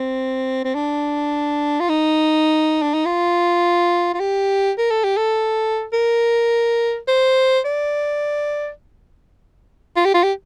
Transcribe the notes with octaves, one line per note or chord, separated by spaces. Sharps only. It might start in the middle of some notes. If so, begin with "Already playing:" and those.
Already playing: C4
C4
D4
F4
D#4
D4
D#4
F4
F4
G4
A#4
A4
G4
A4
A#4
C5
D5
F4
G4
F4
G4